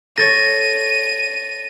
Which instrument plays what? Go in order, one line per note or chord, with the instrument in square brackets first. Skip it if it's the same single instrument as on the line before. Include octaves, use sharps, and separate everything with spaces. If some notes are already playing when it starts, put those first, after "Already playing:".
[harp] A4 C#5 [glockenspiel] A6 A#6 [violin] D#7